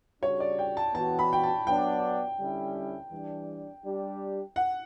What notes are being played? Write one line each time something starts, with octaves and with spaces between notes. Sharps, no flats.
C#3 G3 D4 F#4 C#5
D5
G5
A5
E3 B3 F#4 A5
B5
G5
A5
F#3 B3 D4 F#4 G5
D3 G3 C#4 E4
E3 G3 D4
G3 D4 G4
F#5